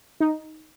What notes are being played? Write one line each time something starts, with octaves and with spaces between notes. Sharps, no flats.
D#4